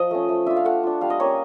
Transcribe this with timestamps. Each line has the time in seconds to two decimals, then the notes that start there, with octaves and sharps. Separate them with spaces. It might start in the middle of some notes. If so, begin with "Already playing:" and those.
Already playing: F3 D#5
0.11 A3 C#4
0.29 A3
0.46 D4 F4 E5
0.56 F5
0.65 A3 F#5
0.84 D4 F4
1.01 G3 F5
1.10 D#5
1.20 A#3 C#4 C#5